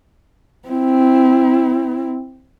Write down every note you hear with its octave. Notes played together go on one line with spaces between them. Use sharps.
C4 E4